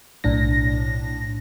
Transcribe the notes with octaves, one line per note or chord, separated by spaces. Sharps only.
B1 A2 D4 A#6